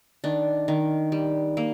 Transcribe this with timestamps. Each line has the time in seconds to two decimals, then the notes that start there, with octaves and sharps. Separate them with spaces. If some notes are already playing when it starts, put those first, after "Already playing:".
0.24 D#3 D4
0.68 D#3
1.12 G3
1.57 A#3